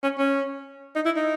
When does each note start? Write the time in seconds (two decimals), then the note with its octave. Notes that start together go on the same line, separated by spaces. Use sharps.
0.03 C#4
0.18 C#4
0.96 D#4
1.06 E4
1.16 D#4